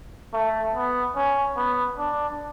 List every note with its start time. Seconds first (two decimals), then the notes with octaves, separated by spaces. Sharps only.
0.34 A3
0.75 B3
1.16 C#4
1.57 B3
1.98 D4